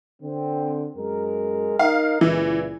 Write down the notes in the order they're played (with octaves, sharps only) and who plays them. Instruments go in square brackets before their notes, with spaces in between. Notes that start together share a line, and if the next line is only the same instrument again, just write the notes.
[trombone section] D3 C4
F#2 G#3 A#4
[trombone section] D#4 A#4 [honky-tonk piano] F5
[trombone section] C#2 A#2 [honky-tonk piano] E3